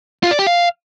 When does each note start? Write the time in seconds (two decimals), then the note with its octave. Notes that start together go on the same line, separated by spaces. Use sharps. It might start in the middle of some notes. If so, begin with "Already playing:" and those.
0.23 F4
0.31 D5
0.39 G4
0.47 F5